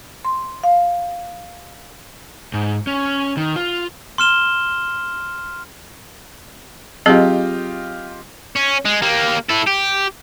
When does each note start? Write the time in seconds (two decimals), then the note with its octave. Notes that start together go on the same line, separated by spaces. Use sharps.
0.25 C6
0.64 F5
2.54 G#2
2.87 C#4
3.37 D#3
3.56 F4
4.18 C6 F6 E7 G7
7.06 F#3 C4 F4 G4 G#4 D#5
8.56 C#4
8.85 G#3
9.02 A#3 G4
9.49 E4 A4
9.67 G4